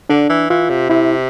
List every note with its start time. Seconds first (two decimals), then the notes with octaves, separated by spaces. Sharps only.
0.09 D3 D4
0.30 E3
0.50 E3 F4
0.70 C3
0.90 C3 E4